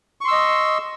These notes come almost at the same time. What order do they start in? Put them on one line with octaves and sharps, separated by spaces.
C#6 C6 E6 D#5